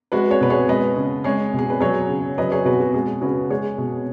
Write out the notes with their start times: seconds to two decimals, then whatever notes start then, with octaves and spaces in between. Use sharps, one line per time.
0.12 G#3 F#4 B4
0.31 G#4 C#5
0.41 B2 B4
0.50 G#4 C#5
0.68 G#3 B4 D#5
0.96 C#3
1.24 G#3 G#4 C#5
1.54 B2
1.59 G#4
1.70 B4
1.80 F#3 G#4 C#5
2.09 C#3
2.38 F#3 B4 D#5
2.52 G#4 C#5
2.65 B2 F#4 B4
2.80 F#4
2.94 G#3 G#4
3.21 C#3 F#4 B4
3.50 G#3 G#4 C#5
3.78 B2